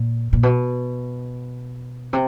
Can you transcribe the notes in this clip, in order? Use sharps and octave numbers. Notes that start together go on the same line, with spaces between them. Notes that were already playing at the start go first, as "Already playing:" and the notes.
Already playing: A#2
A#2
B2
C3